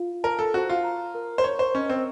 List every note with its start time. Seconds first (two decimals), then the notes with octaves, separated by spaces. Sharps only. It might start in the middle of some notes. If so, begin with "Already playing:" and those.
Already playing: F4 F5
0.23 A#4 A5
0.39 A4
0.54 F#4 C5
0.70 F4
0.84 A#5
1.15 A#4
1.38 C5
1.44 C#5 C#6
1.59 C5
1.75 C#4 D#5
1.90 C4